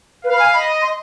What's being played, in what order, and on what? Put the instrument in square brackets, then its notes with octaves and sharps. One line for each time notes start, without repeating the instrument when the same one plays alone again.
[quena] B4 [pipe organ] F5
[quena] B5
G#5
[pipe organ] D#5 [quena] B5
[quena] C6